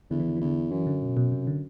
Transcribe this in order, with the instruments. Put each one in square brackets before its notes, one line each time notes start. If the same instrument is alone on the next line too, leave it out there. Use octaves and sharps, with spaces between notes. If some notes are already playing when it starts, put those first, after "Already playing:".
[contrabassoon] E2 [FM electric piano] D3
[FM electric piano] E3
D3
E3
[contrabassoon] E2 [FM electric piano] D3
[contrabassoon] F#2 [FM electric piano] E3
[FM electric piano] D3
B2
B2
C3
D3